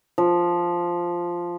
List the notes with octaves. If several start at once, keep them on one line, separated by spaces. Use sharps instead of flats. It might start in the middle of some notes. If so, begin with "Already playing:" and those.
F3